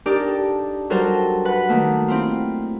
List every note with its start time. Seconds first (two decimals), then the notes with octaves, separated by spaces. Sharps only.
0.06 D4 D#4 G4 A#4 D5
0.28 A4
0.90 F#3 G3 F#4 A4 A#4 C5
1.45 B4 F#5 B5
1.69 D#3 A3 A#3
2.08 C4 E4 F4